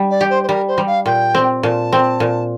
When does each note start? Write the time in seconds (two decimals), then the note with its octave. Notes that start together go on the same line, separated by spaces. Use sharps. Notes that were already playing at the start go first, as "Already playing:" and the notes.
Already playing: G3
0.10 D5
0.21 G4
0.30 C5
0.43 C5
0.49 G3 A#4
0.68 C5
0.78 G3
0.87 F5
1.06 A#2 G5
1.35 C4
1.63 A#2 A5
1.93 C4
2.20 A#2